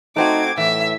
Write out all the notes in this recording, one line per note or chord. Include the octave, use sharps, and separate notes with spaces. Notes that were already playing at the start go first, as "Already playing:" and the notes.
A3 C4 D#4 F#4 D6 G#6
A2 E3 E5